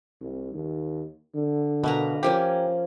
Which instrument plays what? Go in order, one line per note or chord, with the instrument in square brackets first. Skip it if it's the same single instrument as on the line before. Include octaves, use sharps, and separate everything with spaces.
[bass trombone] C2
D#2
D3
[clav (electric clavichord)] B2 [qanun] A#3 B4 A#5
[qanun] F3 A#3 C#4 [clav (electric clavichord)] G4